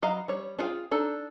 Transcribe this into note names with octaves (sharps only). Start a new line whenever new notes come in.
F#3 D#5 F5 A#5 B5
G3 C#5
D4 F4 G#4 F5 G5
D4 D#4 A4